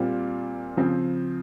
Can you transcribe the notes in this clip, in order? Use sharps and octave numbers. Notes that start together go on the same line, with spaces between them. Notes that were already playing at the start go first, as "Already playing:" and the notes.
Already playing: A#2 G3 C4 F4
C#3 F3 C4